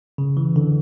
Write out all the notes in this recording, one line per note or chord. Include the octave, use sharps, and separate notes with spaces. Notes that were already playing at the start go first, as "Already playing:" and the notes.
C#3
E3
D3